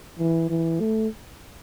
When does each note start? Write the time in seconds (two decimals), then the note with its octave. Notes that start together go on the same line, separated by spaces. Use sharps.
0.19 E3
0.50 E3
0.80 A3